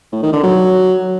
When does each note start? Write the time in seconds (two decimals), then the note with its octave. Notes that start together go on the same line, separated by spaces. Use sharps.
0.12 A2
0.23 D#3
0.33 D3
0.43 F#3